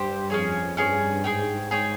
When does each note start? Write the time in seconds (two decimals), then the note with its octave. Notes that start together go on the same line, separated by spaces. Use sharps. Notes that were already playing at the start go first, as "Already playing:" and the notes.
Already playing: G2 G4 C5 G5
0.30 F2 C#4 G#4 C#5
0.77 G2 C#4 G#4 C#5
1.24 G#2 G#4 C#5 G5
1.71 G#4 C#5 G5